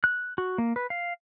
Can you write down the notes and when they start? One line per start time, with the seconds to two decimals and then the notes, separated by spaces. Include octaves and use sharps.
0.04 F#6
0.38 F#4
0.58 A#3
0.76 B4
0.90 F5